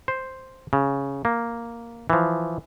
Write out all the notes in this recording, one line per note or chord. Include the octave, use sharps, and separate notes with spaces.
C5
C#3
A#3
E3 F3